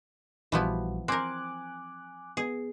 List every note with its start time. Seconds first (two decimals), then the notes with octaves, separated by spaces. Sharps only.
0.52 A#1 E3 F3 G3 B3 F#4
1.08 C4 A#4 G#5 D6 F#6
2.37 B3 G#4